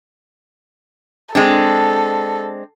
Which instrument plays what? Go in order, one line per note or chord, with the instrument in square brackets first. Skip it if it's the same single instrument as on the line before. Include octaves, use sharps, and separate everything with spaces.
[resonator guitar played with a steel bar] G#3 C4 D4 [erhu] A4